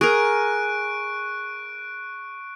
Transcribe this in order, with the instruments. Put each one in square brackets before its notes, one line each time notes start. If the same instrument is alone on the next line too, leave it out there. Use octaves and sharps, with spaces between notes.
[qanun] G#4 A#4 [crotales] C#6 F#6 D7